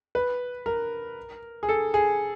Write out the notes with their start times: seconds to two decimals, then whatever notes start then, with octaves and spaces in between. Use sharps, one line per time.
0.15 B4
0.66 A#4
1.63 G#4
1.69 A4
1.94 G#4